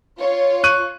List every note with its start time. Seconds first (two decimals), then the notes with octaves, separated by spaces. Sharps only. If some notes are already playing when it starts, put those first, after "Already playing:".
0.18 F4 C#5
0.64 C#6 F#6 D#7